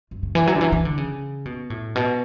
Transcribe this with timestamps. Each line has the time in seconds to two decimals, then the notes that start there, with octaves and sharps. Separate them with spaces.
0.11 F#2
0.23 C#3
0.35 E3
0.47 F#3
0.56 D3
0.61 E3
0.72 E3
0.85 D3
0.98 C#3
1.45 B2
1.70 A2
1.95 B2